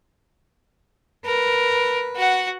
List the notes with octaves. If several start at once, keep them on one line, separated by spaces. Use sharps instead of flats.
A#4 B4
F#4 F#5